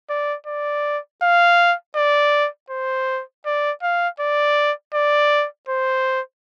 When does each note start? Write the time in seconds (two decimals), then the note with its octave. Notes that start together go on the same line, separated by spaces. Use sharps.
0.10 D5
0.47 D5
1.22 F5
1.96 D5
2.70 C5
3.46 D5
3.82 F5
4.20 D5
4.94 D5
5.69 C5